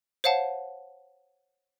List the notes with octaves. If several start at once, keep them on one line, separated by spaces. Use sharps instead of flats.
C5 C#5 F5 F#5 A5